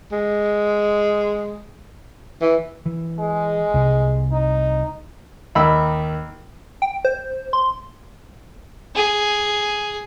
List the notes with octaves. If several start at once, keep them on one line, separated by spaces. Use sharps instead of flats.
G#3
E3
E3
G#3
C2
D#4
D#2 D#3 B5 E6
G5
C5
C6
G#4